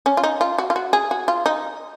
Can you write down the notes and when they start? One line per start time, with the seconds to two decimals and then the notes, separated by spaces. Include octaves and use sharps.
0.06 C#4
0.17 F4
0.23 D#4
0.41 F4
0.58 F#4
0.70 F4
0.76 F#4
0.93 G#4
1.11 F#4
1.28 F4
1.46 D#4